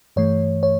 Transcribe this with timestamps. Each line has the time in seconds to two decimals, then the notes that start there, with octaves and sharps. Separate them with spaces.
0.16 G2 E3 A3 C#5
0.63 C#5